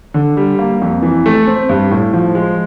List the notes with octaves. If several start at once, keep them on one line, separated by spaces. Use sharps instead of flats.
D3
G3
A#3
F2
E3
A3
C4
G2
A2
F3
G#3